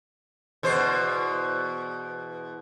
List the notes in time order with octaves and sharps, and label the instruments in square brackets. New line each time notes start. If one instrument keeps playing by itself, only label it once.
[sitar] E2 B2 C5